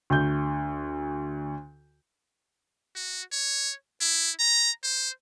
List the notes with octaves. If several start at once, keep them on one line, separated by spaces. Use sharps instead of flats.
D2 G6
F#4
C#5
E4
A#5
C5